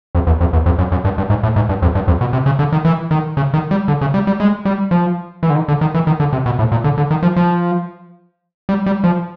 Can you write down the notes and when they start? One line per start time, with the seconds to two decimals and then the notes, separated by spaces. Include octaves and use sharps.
0.15 F2
0.27 E2
0.41 F2
0.53 E2
0.66 F2
0.78 F#2
0.92 F#2
1.05 G2
1.18 G2
1.30 G#2
1.43 A2
1.56 G#2
1.69 G2
1.82 F2
1.95 G2
2.08 F2
2.21 B2
2.33 C3
2.46 C#3
2.59 D3
2.72 D#3
2.85 E3
3.11 D#3
3.37 C#3
3.54 D#3
3.71 G3
3.88 D3
4.01 C#3
4.14 G3
4.27 G3
4.40 G#3
4.65 G3
4.91 F3
5.43 E3
5.50 D3
5.55 D#3
5.68 D3
5.81 D#3
5.94 E3
6.07 D#3
6.20 D3
6.33 C3
6.46 B2
6.59 A2
6.72 A#2
6.84 D3
6.98 D3
7.11 D#3
7.23 F3
7.36 F3
8.69 G3
8.86 G3
9.04 F3